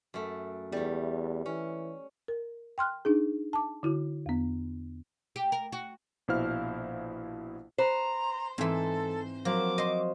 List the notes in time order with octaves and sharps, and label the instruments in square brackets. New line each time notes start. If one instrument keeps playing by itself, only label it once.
[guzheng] F#2 A3
[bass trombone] E2 [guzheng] G3 A3
[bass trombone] E3 [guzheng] C#4
[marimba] A#4
G5 C6 F6 F#6
D4 D#4 G#4
A5 D6
D3 E4 F#4
E2 B3
[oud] G4
A#4
F#4
[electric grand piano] A#1 B2 E4 C5 F5 F6
[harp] B4 [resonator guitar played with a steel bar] C5 [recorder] A#5
[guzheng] G#2 E3 [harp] C4 E5 [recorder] A4
[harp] F3 F#3 [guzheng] A#3 [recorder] D6
[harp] C5 [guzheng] D#5 C6